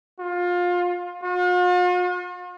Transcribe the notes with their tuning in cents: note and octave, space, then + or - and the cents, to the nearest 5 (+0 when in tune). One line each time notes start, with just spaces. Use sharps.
F4 +25
F4 +45